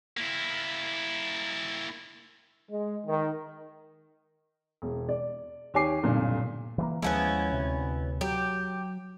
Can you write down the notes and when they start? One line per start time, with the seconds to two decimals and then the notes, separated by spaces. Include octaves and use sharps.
0.17 A#3 E4
2.70 G#3
3.07 D#3
4.82 E1
5.09 D5
5.74 D#2 G4 C#5 G#5 D6 C7
6.03 F1 B1 G2 A#2 D3
6.78 E3 G3 A#3
7.02 D#2 F3 G#3 B3 C#4 E4
7.52 D2 C3
8.21 F#3 G4